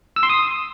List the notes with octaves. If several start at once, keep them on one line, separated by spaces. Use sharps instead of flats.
E6
C6
D#6